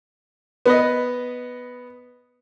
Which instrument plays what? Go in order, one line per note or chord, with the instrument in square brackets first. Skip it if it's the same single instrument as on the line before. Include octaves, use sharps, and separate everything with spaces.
[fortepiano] B3 B4 D#5